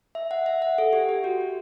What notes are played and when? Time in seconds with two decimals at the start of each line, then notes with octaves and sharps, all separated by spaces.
0.15 E5
0.31 F#5
0.46 E5
0.62 F#5
0.78 A4
0.93 G4
1.09 G4
1.24 F#4
1.41 F#4